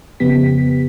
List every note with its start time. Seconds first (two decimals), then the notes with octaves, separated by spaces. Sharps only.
0.20 F2 C#3 B3 G4 B6